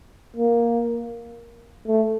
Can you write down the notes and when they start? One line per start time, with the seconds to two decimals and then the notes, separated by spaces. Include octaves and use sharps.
0.36 A#3
1.87 A3